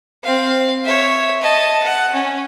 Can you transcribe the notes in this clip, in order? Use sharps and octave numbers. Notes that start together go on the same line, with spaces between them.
C4 F5
C#5 E5
D#5 A5
F#5
C#4